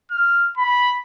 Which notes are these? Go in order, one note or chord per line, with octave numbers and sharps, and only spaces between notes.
F6
B5